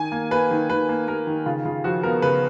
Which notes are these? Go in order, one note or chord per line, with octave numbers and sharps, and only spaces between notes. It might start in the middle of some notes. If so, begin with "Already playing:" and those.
Already playing: D#3 G#5
A#3
A#3 B4
D#3
D#3 B4
A#3
A#3 A#4
D#3
C#3 F4
C#3 F4
F3 F#4
B3 A#4
C#3 B4